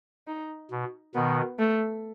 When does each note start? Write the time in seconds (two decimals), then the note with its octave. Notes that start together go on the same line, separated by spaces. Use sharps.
0.27 D#4
0.71 B2
1.15 B2 D#3 B3
1.59 A3